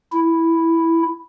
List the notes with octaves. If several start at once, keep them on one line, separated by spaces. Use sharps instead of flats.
E4